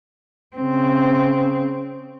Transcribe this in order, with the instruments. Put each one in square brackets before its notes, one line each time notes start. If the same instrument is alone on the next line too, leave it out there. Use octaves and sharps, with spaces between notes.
[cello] C#3 C4